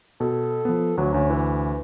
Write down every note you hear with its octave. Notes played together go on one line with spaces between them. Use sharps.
B2 A4
F3 B3
D2 F#3 B4
D2 C#4
E3